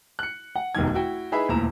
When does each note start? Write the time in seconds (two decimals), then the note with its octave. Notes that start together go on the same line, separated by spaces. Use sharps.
0.19 F#6 C#7
0.56 F#5
0.75 F1 B1 E2 D#3 D#4 G#6
0.94 E4 F#4 G5
1.32 D#4 E4 G#4 B4 E5 B5
1.48 E1 D2 A#2 E4 A#5 E7